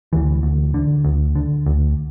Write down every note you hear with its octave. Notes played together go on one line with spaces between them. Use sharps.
D2 E3
D2
D3
D2
D3
D2